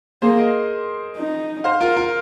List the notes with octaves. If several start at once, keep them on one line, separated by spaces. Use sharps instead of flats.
A#3 G#4 C5
A#4 D#5
D#4
C5 F5
F4 A#4
F4 A#4